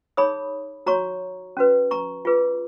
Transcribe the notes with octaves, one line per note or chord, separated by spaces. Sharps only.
D#4 G#4 C#5 B5 D#6
F#4 C#5 A#5 C#6
C#4 F#4 B4
A#5 C#6
F4 G#4 B4